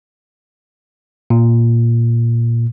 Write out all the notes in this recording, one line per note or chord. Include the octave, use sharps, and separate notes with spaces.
A#2